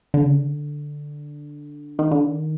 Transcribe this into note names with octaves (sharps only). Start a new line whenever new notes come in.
D3
C#3
D3
D#3
D3
D#3